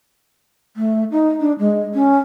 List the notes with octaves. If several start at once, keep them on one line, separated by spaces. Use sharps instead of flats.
A3
D#4
D4
G#3
C#4